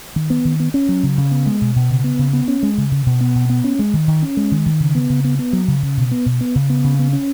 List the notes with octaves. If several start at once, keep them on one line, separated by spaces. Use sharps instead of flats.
D#3
B3
D#3
B3
C#4
F#3
C#3
C#3
B3
G#3
B2
B2
C#3
B3
C#3
B3
C#4
G#3
C#3
C#3
B2
B3
B2
B3
C#4
G#3
D#3
D#3
C#4
G#3
D#3
D#3
C#3
B3
C#3
B3
B3
F#3
C#3
C#3
B2
B3
B2
B3
C#3
B3
C#3
B3
C#4